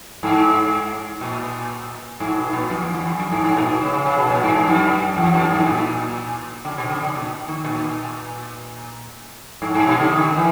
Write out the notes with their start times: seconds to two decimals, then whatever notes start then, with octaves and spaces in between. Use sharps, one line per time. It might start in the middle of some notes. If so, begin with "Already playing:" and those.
0.23 G#2
1.21 A#2
2.20 G#2
2.37 B2
2.53 A#2
2.70 F#2
2.82 E2
2.95 E2
3.07 F#2
3.19 F#2
3.31 G#2
3.44 G#2
3.57 A#2
3.69 B2
3.81 C#3
3.93 C#3
4.05 C#3
4.18 B2
4.30 A#2
4.43 G#2
4.55 G#2
4.68 F#2
5.17 E2
5.34 F#2
5.51 G#2
5.66 A#2
6.65 C#3
6.78 B2
6.90 C#3
7.03 C#3
7.15 A#2
7.48 D#3
7.64 A#2
9.62 G#2
9.74 G#2
9.87 B2
9.99 C#3
10.12 D#3
10.37 E3